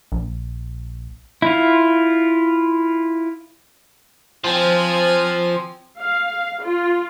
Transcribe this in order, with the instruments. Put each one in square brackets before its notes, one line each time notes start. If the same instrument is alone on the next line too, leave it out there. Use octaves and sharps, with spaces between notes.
[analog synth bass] A#1
[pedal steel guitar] E4 F4
[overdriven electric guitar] F3 [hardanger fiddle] C4 G#5
[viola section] F5
F4